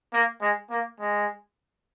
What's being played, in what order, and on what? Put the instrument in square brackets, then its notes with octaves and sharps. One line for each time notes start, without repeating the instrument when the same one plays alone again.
[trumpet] A#3
G#3
A#3
G#3